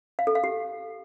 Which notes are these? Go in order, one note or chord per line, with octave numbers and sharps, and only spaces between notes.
F5
A4
F5
G4